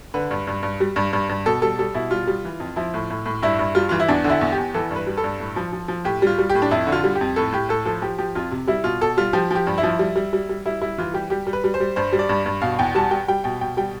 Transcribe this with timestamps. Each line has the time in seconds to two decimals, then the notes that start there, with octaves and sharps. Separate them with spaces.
0.14 D3 B4
0.31 G2
0.47 G2
0.63 G2
0.80 G3
0.96 G2
1.13 G2
1.29 G2
1.46 B2 A4
1.62 G3 A4
1.79 G3 A4
1.94 B2 E4
2.11 G3 F4
2.27 G3
2.45 E3
2.60 F2
2.76 F3 E4
2.94 A2
3.10 A2
3.26 A2
3.43 G2 E4
3.59 G2
3.75 G3 F4
3.89 E3 F4
4.00 E4
4.08 E2 D4
4.24 D3
4.30 E4
4.41 E2
4.52 G4
4.58 E2
4.74 E3 A4
4.91 G2
4.96 B4
5.07 G3
5.17 A4
5.24 G2
5.40 A2
5.56 F3
5.73 F3
5.88 F3
6.05 A2 G4
6.22 G3 F4
6.38 G3
6.49 G4
6.55 A2
6.62 D4
6.71 F2 E4
6.87 D3
6.92 F4
7.04 G3
7.15 G4
7.21 F2
7.36 A2 A4
7.52 A2 G4
7.69 A2 A4
7.85 F3 A4
8.02 F3 G4
8.18 F3 G4
8.35 F2 F4
8.51 C3
8.67 G3 E4
8.84 B2 F4
9.01 B2 A4
9.17 G3 F4
9.33 F3 G4
9.50 F3 G4
9.67 G2
9.78 E4
9.83 F3
9.99 G3
10.16 G3
10.33 G3
10.49 G3
10.66 G3 E4
10.81 G3 E4
10.98 E3 F4
11.14 G3 G4
11.30 G3 G4
11.47 G3
11.53 B4
11.64 G3
11.74 C5
11.80 G3
11.96 G2 C5
12.13 G3
12.19 D5
12.29 G2
12.46 G2
12.62 B2 F5
12.79 E2 G5
12.95 G3 A5
13.11 G3 G5
13.28 G3 G5
13.44 B2 G5
13.61 B2 G5
13.77 G3 G5